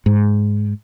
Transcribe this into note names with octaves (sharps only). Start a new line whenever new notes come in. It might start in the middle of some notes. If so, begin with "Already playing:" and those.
G#2